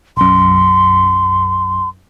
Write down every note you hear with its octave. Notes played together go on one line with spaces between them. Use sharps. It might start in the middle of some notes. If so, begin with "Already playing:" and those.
B1 F#2 C6